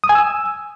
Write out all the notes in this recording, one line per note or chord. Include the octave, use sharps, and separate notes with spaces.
D#6
G#5
E6